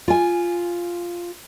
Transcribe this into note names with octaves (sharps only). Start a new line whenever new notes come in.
F4 G#5